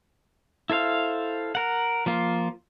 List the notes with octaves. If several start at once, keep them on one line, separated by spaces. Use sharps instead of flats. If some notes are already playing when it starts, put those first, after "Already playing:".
E4 A4 C5 F5
A#4 F#5
F3 A#3 F4